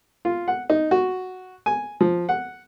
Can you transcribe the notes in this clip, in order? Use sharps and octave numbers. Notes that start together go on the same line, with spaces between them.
F4
F#5
D#4
F#4
G#5
F3
F#5